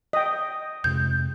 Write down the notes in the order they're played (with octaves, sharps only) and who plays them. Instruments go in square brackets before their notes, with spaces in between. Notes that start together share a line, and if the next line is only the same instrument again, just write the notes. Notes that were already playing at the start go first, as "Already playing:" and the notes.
[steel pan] D#5 G5
[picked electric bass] F2 C3 G#3 [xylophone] G6